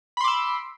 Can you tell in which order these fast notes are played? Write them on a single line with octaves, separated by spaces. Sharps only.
B5 C6 D6 E6